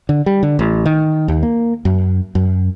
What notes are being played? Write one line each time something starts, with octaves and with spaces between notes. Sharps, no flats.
D3
G3
D3
A1
D#3
D#2
A#3
F#2
F#2